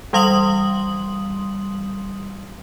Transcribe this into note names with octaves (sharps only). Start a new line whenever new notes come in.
E3 G3 F5 C6 D#6 F#7